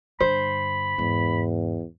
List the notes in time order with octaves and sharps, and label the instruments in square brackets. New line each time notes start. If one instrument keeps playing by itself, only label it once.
[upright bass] G2 D3 [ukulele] C5 [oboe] B5
[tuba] E2 [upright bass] G#2